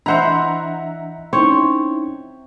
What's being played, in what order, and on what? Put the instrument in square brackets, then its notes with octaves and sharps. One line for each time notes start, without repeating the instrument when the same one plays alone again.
[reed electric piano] E3 D4 D#5 [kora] E4 C5 [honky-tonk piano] E5 F#5 A#5
[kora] C4 C#5 [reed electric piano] C#4 D#4 E4